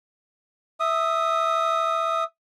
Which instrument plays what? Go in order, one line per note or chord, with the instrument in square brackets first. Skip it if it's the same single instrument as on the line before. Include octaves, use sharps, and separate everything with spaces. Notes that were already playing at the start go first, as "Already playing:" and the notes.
[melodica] E5 D#6